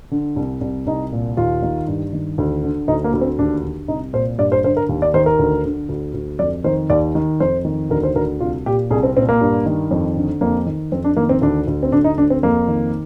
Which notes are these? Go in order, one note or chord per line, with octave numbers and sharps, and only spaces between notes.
D3
C2
C2
C2 D#4
A#2
D#2 F4
D#3
G2
D#3
D2
D3
D2 D#4
A#3
D2
C4
D#2 D4
D3
C2 D#4
A#2 C5
G2 D5
C5
D3 C5
A#4
D#2
D5
D#3 C5
A#4
D2
D3
D2
D2
F2 D5
D#3 C5
D#2 D5
D#3
F2 C5
D#3
D2 A#4
C5
D2 A#4
C2 F4
A#2 G4
C2 G#4
C4
A#2 C4
A#3
G2
D#3
F2
D3
F2 A#3
D#3
F2 C4
D4
D#3 A#3
C4
D2 D4
D2
C4
D2 D4
D#4
D2 D4
C4
F2 A#3
D#3